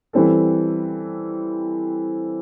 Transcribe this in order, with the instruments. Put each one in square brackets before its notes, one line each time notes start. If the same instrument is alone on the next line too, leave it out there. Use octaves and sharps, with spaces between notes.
[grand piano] E3 G3 C4 E4 A4